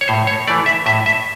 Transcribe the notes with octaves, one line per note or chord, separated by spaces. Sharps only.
C#5
A2 C5
C#5
E3 A3 D5
E5
A2 E5
E5